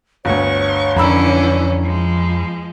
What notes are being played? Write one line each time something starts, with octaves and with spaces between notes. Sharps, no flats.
G1 D2 C#5 C#6
F2 D3 E3 C#4 A#5 B5 E6
F3 G#3